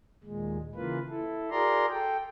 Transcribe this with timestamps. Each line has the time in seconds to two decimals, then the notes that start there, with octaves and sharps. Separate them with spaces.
0.24 D#2 A#2 G#3
0.75 C#3 E3 A#3 F4 B4
1.09 E4 A4
1.51 F#4 G#4 A#4 D5 A#5 C6
1.89 A4 G5